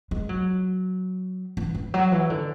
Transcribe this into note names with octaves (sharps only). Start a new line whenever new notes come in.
G#3
F#3
E3
E3
F#3
E3
D3